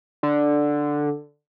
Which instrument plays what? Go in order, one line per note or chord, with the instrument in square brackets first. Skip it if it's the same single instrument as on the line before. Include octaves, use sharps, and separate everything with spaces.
[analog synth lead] D3